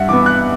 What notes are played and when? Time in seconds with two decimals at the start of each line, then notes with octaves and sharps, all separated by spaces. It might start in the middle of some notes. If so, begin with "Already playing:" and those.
Already playing: G2 E5 F#5
0.09 E3 B3 D6
0.26 F#6